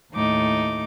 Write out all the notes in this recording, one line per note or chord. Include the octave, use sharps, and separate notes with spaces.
D#2 A2 D#4 D6